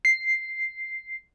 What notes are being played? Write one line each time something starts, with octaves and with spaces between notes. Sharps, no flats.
C7